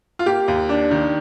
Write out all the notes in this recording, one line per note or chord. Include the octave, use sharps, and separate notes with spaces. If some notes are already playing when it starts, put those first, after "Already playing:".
F4
A#3 G4
D#2
D4
D#3